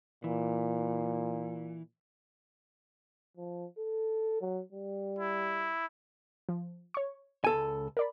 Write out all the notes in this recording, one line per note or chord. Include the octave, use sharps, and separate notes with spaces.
A#2 E3
F3
A4
F#3
G3
E4
F3
C#5 C#6
C#2 A4 G#5
A#4 D5 B5